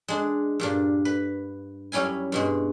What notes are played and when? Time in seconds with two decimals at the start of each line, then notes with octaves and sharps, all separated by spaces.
0.08 G#3 D4
0.60 G2 A#2 D4
1.05 B4
1.92 F#2 G3 C#4 E4 G#5
2.32 G2 B2 G#3